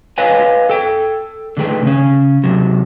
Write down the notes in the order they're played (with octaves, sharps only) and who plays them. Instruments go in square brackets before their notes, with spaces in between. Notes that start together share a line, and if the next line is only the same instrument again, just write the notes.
[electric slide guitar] B4 C#5 D#5 F5 G5 G#5
A4 G5
D3 D#3 A3 G#4 B4 G5
C#3 C#4
C3 F#3